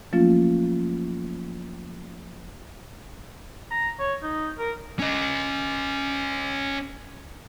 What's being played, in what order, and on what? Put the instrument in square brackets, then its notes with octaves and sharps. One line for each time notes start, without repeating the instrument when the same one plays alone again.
[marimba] F3 F#3 A3 A#3 C#4 F4
[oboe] A#5
C#5
D#4
A#4
[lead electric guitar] C#4 D#5